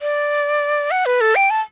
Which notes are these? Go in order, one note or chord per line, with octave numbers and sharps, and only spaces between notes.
D5
F#5
B4
A4
G5
A5